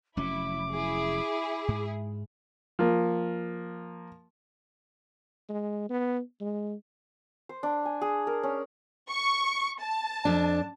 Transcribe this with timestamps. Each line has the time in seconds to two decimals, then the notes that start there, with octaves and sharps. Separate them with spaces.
0.17 F1 F#3 C#4 E4 D6
0.72 E4 G#4
1.68 G#2
2.79 F3 A#3
5.49 G#3
5.89 B3
6.41 G#3
7.49 C5
7.63 D4
7.86 G#5
8.01 G#4
8.27 A#4
8.43 C#4
9.10 C#6
9.80 A5
10.25 F2 D4